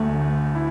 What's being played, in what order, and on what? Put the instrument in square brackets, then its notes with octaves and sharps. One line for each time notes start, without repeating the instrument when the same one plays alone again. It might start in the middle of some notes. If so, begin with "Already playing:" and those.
Already playing: [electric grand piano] D2 [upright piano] A3
[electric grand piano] D3
E4